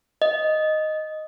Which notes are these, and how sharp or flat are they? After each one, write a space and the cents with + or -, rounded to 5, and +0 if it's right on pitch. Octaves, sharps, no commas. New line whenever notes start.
D#5 +0